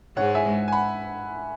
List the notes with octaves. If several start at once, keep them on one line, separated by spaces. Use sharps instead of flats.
G#2 G#3 C#5 F#5
E5 G#5
G#5
F#5 B5